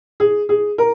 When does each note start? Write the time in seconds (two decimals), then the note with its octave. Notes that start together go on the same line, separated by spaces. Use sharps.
0.20 G#4
0.49 G#4
0.78 A#4